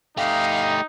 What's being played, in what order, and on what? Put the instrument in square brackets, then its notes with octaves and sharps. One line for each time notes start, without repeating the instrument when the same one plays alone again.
[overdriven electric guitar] A3 G4 [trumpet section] D#4 [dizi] F5